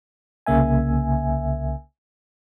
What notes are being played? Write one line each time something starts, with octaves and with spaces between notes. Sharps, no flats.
C2 C#3 A#3 E5 G#5